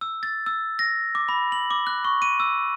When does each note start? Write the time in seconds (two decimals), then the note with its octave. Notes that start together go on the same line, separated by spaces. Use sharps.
0.01 E6
0.23 A6
0.46 E6
0.79 A#6
1.15 D6
1.29 B5
1.52 F#7
1.71 D6
1.87 F#6
2.05 C#6
2.22 D#7
2.40 E6